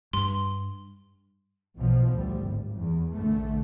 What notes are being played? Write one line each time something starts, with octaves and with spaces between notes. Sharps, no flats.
G2 C6
B1 B2 F3
D2 A2 G3
G#1
E2
A#1 D3 A3